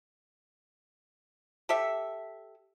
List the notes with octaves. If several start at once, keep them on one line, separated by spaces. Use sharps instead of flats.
G4 A4 E5